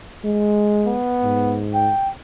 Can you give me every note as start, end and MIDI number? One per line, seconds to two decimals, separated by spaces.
0.25 0.98 56
0.86 1.60 59
1.23 1.92 44
1.74 2.10 79